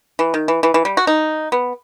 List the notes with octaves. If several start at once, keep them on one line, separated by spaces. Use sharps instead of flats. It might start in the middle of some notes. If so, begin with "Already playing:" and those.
E3
D#3
E3
E3
E3
G3
F#4
D#4
B3